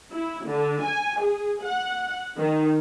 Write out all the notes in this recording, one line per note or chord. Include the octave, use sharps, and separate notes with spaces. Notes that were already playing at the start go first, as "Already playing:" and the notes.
E4
D3
G#5
G#4
F#5
D#3